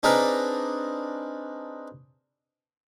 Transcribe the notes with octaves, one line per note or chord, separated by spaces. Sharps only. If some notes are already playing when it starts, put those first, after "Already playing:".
C4 D4 D#4 G#4 A#4 B4